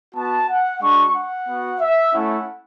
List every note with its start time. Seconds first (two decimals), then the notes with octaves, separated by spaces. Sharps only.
0.14 B3 F#4 A5
0.48 F#5
0.81 G#3 D4 F#4 C#6
1.14 F#5
1.47 B3 F#4
1.80 E5
2.13 A3 C#4 E4 F#5